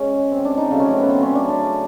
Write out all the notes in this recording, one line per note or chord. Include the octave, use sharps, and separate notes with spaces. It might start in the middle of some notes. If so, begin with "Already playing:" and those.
Already playing: G#3 C#4
C4
D4
D#4
C#3 F#3 A3 D4
C#4
C4
B3
C4
C#4
D4
D4